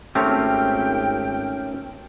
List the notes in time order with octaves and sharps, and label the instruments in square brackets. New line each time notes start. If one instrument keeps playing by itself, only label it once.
[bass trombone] G#1 [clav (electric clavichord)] A3 C4 G4 [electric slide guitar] C#4 A#4 [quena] G5